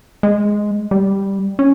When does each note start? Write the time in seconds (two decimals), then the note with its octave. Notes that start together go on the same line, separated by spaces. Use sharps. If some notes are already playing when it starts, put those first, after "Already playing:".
0.23 G#3
0.91 G3
1.59 C#4